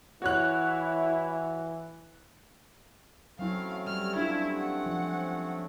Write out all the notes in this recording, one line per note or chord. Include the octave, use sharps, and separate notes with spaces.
E3 E4 F#4 C#5 F#6
F#3 A3 C4 C#4 E4 F5
G3 F6
D4 E4 F4
F#5
F3